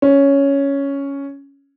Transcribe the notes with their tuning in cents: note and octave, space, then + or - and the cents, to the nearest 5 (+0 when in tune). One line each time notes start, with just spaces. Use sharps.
C#4 +5